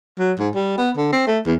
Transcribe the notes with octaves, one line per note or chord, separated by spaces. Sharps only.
F#3
G#2
G3
B3
D3
C4
A3
E2